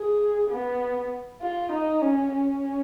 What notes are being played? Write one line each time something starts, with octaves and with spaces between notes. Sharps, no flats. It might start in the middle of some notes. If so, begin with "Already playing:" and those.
Already playing: G#4
B3
F4
D#4
C#4
C#4